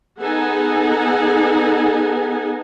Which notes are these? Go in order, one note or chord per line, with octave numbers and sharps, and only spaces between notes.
B3 D#4 G#4 A4 F#5 G#5